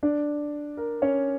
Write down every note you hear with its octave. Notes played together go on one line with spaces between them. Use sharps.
D4 D5
A#4
C#4 C#5